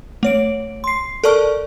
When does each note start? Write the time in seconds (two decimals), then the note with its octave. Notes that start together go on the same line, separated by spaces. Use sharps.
0.23 A3 C#5 D7
0.84 C6 C7
1.24 A4 A#4 D5 A5 C#6 F6